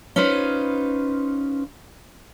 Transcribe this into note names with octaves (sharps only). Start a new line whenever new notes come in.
C#4 D#4 F4 B4 C5